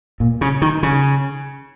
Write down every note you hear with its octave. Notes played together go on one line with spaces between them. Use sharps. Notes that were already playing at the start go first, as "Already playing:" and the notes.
A#2
C#3
D#3
C#3